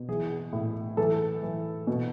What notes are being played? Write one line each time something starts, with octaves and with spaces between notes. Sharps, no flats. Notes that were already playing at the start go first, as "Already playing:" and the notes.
Already playing: B2
E3 G#4
A2
E3 A4
E3
B2